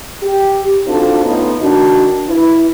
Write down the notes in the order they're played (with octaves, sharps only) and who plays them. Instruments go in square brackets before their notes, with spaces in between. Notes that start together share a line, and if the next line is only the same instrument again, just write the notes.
[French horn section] G4
C4 D4 D#4 F4 F#4 A4
A3 B3 C#4 D#4 F4
D#3 D4 D#4 F#4
E4 B4